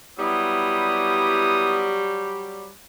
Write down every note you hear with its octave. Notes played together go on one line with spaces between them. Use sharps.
F#3 G3 B3 E4 D#6